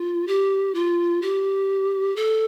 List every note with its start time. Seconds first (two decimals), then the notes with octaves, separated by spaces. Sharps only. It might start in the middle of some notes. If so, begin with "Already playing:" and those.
Already playing: F4
0.27 G4
0.75 F4
1.22 G4
2.16 A4